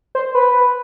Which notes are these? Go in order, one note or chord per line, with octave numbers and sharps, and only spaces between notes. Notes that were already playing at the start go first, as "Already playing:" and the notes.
C5
B4